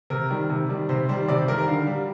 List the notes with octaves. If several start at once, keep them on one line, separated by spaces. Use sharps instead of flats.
C3 A#4
D#3 G3
C3
D#3 G3
C3 C5
D#3 G3 C5
C3 D5
C5
D#3 G3 A#4
A#4
D3 F5
G3